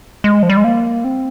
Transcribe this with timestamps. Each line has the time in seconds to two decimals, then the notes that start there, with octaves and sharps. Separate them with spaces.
0.24 G#3
0.43 F3
0.50 G3
0.57 G#3
0.64 A#3
1.04 C4